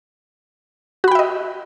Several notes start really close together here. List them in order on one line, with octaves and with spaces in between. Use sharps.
F#4 B5 G5 E5 D#5